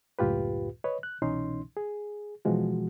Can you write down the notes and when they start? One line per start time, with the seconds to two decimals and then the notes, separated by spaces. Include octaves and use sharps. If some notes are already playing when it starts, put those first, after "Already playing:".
0.19 C#2 F#2 A2 F4 G4 B4
0.84 B4 C#5 D#5
1.03 F#6
1.22 C2 B2 E3 C#4 D#4 C6
1.77 G#4
2.45 B2 E3 F3 G#3 F#4